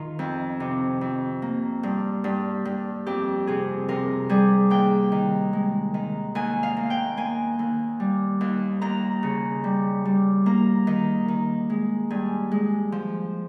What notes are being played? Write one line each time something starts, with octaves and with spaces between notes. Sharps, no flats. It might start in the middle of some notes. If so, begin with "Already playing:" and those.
Already playing: D#3 F4
F2
C3
F2
A#3
G2
G2
G2
F2 G4
C3 G#4
C3 A#4
G3 G#4
D#2 G5
D#3
G#3
D#3
D#2 G#5
F5
A#3
G5
A#3 G#5
D#2
G3
D#2
D#2 A#5
C#3
G3
G3
A#3 A#5
D#3
D#3
G#3
G2 G#5
G#3
F3